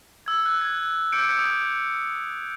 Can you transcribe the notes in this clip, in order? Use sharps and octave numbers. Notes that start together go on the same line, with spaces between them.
E6 G#6
F#6
G#6
D6 E6 G6 C#7 D7
D#6